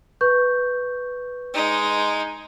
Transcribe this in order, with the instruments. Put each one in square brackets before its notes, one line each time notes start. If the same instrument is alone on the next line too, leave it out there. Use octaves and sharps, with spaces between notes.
[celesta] B4 C#6 G6
[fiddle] G#3 D#4